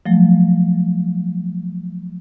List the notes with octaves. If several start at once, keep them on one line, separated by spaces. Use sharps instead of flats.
F3 F#3 A3